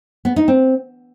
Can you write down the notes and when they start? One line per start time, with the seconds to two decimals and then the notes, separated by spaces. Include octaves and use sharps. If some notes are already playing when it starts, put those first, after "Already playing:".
0.25 B3
0.36 D#4
0.48 C4